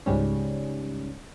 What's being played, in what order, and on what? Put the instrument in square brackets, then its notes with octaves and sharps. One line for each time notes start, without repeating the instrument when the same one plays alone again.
[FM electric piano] C#2 G#2 G3 C#4